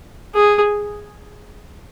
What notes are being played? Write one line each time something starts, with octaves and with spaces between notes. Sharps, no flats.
G#4